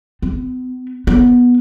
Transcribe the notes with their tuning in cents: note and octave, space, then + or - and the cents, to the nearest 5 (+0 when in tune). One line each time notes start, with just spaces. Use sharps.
B3 +45
B3 -10